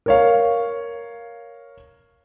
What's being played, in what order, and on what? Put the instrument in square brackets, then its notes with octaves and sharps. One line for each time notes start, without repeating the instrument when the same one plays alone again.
[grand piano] A#4 C#5 F5